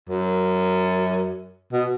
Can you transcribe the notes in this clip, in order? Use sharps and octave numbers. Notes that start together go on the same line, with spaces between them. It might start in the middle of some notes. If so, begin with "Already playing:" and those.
F#2
B2